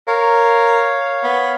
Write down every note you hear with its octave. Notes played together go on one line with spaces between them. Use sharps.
A#4 C#5 F5
B3